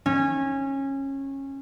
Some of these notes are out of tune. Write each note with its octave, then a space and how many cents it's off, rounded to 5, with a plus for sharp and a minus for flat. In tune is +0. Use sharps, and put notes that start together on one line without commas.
C#4 -20